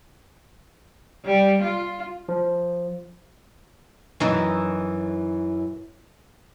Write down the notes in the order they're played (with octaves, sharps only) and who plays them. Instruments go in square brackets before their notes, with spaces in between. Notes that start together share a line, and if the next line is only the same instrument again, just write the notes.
[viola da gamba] G3
F4
[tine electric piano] F3
[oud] F#2 E3 D#4